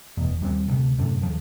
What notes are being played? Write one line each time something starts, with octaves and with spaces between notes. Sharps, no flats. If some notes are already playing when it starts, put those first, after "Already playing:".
F1 E2 B2
D#2 G3 B3 C4
D1 D2 C3
F#2 A2 C3
D#2 F3